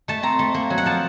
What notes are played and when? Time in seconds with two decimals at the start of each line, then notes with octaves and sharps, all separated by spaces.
0.08 A3 A5
0.23 C4 A#5
0.39 A3
0.54 A#3
0.70 F#3
0.78 F#5
0.85 F3 A5